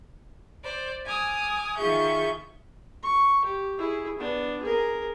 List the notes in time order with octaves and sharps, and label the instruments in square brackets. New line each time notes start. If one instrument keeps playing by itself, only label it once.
[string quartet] C5 D5
G#5 D6 D#6 F6
D#3 F4 G#4 E5 C#6 G6
[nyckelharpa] C#6
G4
E4 G#4
B3 D4
G#4 A#4